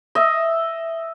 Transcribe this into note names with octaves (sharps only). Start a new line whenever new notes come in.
D#5 E5